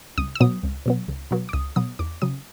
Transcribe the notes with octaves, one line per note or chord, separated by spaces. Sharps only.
C#2 D#6
E6
B2 F#3 B3 D#6
C#2
B2 F#3 B3
C#2
B2 F#3 B3
D6
C#2 D#6
B2 F#3 B3 D#6
E2 D6
C#3 F#3 D#6